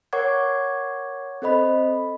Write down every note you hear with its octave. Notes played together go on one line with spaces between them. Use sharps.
A#4 C#5 F#5 C#6 D6 G#6
C4 A4 C5 D#5 B5